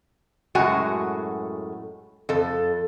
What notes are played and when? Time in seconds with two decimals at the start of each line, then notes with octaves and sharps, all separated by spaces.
0.55 F#2 A2 G#3 F#4 G#5
2.29 F2 A4